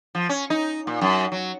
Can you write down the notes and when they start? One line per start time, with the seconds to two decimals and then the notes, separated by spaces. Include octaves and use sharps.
0.15 F3
0.29 C#4
0.50 D#4
0.87 A#2
1.01 F#2
1.32 F#3